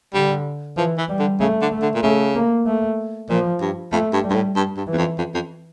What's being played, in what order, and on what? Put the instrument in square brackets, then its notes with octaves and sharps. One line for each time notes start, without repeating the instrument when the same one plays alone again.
[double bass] D3 [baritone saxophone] G3
[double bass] E3 [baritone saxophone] F3
[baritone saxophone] E3
[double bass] G3
[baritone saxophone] D3
[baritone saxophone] C#3 [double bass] A3
[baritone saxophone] D3
[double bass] A3
[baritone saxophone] D3
A#2
[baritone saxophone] C#3 [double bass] A3
[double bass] A#3
A3
[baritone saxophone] A#2 [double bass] F3
[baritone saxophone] G2
[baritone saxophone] F2 [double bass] A3
[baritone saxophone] G2
[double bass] G3
[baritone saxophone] G2
A2
G2
G2
[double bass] E3
[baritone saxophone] E2
F2
F2
F2